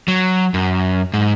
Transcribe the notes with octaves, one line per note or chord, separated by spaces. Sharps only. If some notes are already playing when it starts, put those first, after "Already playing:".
F#3
F#2
G#2